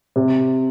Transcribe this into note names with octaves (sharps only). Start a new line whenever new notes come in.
C3